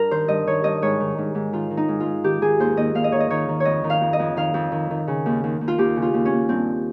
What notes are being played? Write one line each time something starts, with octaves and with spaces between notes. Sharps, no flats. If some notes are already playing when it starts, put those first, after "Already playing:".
Already playing: G2 A#4
D#3 C5
G2 D#5
D#3 C#5
G2 D#5
G#2 C#5
D#3
G#2
G#2
D#3 F4
D#3
D#4
G#2
F4
G#2
D#3 G4
D#3 G#4
D#2 C5
D#2 D#5
D#2 F5
D#5
D#3 C#5
D#5
D#3 C#5
D#3
C#5
F2 D#5
D#3
F5
F2
D#5
F2
D#3 F5
F2
D#3
D#3
C#3
D#2
D#2
D#2
F4
D#2 G4
C#3
F4
D#2
C#4
D#2
G2 C4